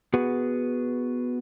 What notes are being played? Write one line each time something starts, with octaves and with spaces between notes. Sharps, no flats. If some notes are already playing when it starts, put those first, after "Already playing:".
B3 F#4 G#4 B4